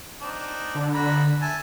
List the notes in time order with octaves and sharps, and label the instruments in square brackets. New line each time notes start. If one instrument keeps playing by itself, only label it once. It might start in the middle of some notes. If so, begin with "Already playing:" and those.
[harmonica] C4 D4 D#4
[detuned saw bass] D3
[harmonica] F#4 A#5 B5
E5 G#5 A5